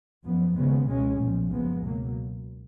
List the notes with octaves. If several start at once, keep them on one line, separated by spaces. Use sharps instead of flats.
F#2 F3 B3
D#2 C#3 G#3 B3
C#2 B2 G#3 C#4
B1 A#2 F3
F#1 F#2 F3 G#3 B3
C#2 B2 F#3 A#3